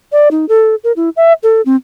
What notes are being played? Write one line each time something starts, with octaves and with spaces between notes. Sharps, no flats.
D5
D#4
A4
A#4
E4
E5
A4
C4